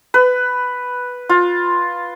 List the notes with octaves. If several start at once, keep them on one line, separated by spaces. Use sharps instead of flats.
B4
F4